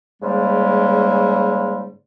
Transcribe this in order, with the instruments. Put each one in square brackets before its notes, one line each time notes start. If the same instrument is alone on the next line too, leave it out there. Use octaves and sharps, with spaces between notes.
[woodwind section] G#2 C#3 G3 G#3 A#3